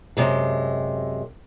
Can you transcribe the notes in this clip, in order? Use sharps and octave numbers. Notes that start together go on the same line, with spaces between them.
F#2 C3 G#3